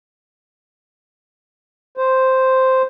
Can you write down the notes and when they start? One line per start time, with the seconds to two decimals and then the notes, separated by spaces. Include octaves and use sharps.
1.97 C5